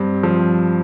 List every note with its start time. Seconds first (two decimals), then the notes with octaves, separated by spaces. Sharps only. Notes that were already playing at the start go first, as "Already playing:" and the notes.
Already playing: G2 C4
0.23 F3